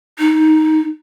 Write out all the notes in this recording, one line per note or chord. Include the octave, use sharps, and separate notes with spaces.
D#4